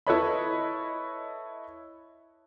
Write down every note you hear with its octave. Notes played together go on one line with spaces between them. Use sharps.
E4 A4 B4 C#5 D#5 B5